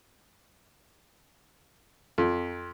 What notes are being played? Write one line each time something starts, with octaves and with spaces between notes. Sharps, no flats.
F2